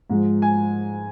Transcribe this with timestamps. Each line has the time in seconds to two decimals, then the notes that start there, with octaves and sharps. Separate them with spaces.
0.10 G#2 F3 G#3
0.42 G#5